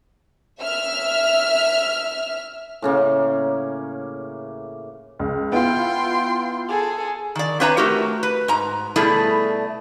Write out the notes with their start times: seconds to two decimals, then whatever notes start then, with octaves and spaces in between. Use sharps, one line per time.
0.63 E5 F6
2.82 A2 C#3 A#3
5.19 C#2
5.52 B3 E4 F4 G5 C6
6.69 G#4 A4
7.35 D#3 D5
7.60 C4 D4 B4 C#5 E5 A#5
7.77 A3 D#4 F#4 G4 A#4
8.23 B4
8.48 G#2 A#5
8.96 B2 G3 A3 E4 G#4 D5